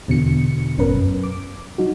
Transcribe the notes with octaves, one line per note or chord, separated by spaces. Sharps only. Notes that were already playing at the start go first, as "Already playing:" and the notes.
E2 B2 D3 C#7
G#1 F#2 B2 C#4 A#4 B4
F#2
D6
F#3 D#4 F#4